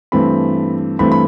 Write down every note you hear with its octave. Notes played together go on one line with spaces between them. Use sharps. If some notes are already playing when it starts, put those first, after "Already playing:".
G2 E3 A3 C4 B5
G2 E3 A3 C4 B5
B5